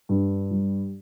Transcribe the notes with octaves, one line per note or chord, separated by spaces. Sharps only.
G2
G3